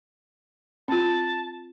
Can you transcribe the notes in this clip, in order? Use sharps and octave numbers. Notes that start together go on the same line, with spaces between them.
C4 F4 A5